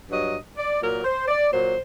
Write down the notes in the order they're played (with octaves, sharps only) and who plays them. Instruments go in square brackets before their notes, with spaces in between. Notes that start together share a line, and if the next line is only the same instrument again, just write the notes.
[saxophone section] G2 F#3 D#5
D5
A#2 F#3 A#4
C5
D5
A#2 F#3 C5